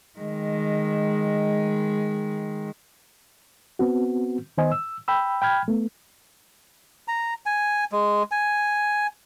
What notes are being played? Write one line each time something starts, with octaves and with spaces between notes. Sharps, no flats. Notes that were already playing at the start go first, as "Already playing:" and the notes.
D#3 G#3
B3 C4 F#4
D#3 B3 C5 D#5 G#5
E6
G5 B5 E6
G5 B5 F6 G#6
A3 B3
A#5
G#5
G#3
G#5